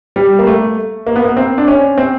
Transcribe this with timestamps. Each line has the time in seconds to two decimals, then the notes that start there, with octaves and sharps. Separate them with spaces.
0.16 G3
0.39 A#3
0.47 A3
1.07 A#3
1.16 B3
1.24 A#3
1.37 C4
1.58 D4
1.67 C#4
1.98 C4